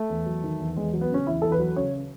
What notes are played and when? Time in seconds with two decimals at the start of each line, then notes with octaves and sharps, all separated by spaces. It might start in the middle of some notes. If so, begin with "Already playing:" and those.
Already playing: A3
0.10 E2
0.26 F#3
0.43 D#3
0.60 E2
0.76 E2 G#3
0.93 F#3
1.01 B3
1.10 C#3 C#4
1.26 E2 E4
1.42 E2 A4
1.52 B4
1.59 F#3
1.76 C#3 C#5